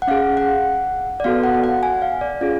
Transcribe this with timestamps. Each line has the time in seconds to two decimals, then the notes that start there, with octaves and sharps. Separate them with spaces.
0.02 F#5
0.08 C#4 G#4 F5
0.37 F#5
1.20 D5
1.24 B3 F#4 A4 F5
1.44 F#5
1.64 F#5
1.83 G#5
2.02 F5
2.21 D5
2.41 C#4 F4 G#4 D5